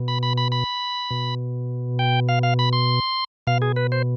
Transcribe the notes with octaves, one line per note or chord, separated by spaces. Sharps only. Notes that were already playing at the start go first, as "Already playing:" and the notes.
Already playing: B2
B5
B5
B5
B5
B2
G5
F5
F5
B5
C6
B2 F5
G#4
B4
C5